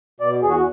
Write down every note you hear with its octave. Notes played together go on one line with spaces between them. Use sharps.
B2 D5
E2 G#4
F#4